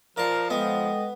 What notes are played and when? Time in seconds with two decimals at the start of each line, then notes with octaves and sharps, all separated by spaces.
0.17 F3 A#4 D5 A5
0.50 G#3 B3 A4 D#5 G5